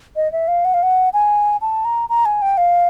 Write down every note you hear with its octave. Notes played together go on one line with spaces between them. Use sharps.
D#5
E5
F5
F#5
F5
F#5
G#5
A5
A#5
A#5
G#5
G5
F5